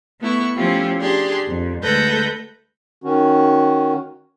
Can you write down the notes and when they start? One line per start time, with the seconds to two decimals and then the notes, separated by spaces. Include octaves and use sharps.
0.21 A3 B3 E4 C#6
0.56 F3 A3 C#4 E4 F4 G4
1.00 D4 G4 G#4 C6
1.47 F2
1.83 D2 G#3 A4 B4 G6 A#6
3.04 D#3 C#4 F#4